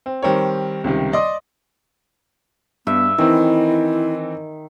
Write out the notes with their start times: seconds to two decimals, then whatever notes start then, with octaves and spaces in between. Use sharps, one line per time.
0.06 C4
0.22 D#3 G3 C4 A#4 C#5
0.84 C#2 C3 D#3 G3
1.13 D5 D#5 C6 D6 D#6
2.87 G2 B3 E5
3.18 D#3 E3 C4 E4